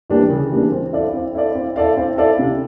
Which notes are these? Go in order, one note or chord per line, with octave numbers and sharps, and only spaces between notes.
E3 G3 A#3 D4
C#3
E3 G3 A#3 D4
C4
E4 A4 D5 F5
C4
E4 A4 D5 F5
C4
E4 A4 D5 F5
C4
E4 A4 D5 F5
C3